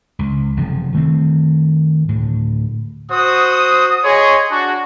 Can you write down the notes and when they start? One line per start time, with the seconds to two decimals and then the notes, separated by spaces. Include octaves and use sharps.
0.19 C#2
0.57 F#1 C3 E3 F3
0.93 D#3 A3 C4
2.09 D2 A2
3.12 F#4 C5 D#6
4.04 G#4 C#5 D#5 C6
4.51 D4 F#4